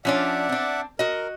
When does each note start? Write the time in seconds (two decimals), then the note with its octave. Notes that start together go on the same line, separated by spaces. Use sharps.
0.05 F3 C#4 D4 D5 E5 F#5
0.49 C4 D4
0.99 F#4 A#4 D#5